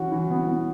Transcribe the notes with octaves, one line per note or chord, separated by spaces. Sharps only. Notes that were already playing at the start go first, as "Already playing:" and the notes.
Already playing: E3 C#4 F#4
E3
B3
B3